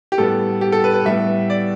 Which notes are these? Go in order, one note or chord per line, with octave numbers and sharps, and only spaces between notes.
G4
A2 G3 B3 A4
G4
A4
B4
B4
A2 G3 B3 E5
D5